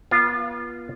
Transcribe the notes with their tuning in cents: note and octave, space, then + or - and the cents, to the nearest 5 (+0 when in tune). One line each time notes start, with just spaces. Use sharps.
B3 -40 F4 -10